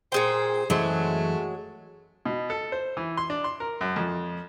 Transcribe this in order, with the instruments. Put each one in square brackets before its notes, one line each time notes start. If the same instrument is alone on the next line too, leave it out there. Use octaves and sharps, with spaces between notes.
[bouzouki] A#2 G#4 G5 [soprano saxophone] C5
[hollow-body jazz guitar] F#2 E3 C5 [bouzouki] F#3 G#3 [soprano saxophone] A3
[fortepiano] B2
A4
C5
E3
C6
D4
C6
A#4
F#2
F2